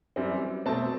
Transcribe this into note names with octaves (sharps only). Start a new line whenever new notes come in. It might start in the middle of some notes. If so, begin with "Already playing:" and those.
F#2 E3 G3 C4
B2 A3 C4 A5